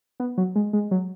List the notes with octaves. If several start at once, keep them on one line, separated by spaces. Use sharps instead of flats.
B3
F#3
G#3
G#3
F#3